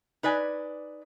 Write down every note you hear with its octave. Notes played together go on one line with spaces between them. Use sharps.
D#4 B4 D5 G#5